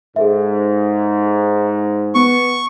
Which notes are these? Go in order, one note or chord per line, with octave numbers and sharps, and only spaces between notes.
G#2 G#4 A4 E5
B3 C#6